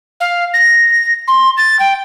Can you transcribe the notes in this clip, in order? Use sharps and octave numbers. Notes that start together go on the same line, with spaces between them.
F5
A#6
C6
A6
G5